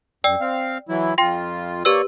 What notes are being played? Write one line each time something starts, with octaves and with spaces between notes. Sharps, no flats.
F#2 D5 G5 E6
C4 F5
E3 F#3 E4
F2 F4 G5 C6 A#6
A#3 G4 B4 C#5 D5 E6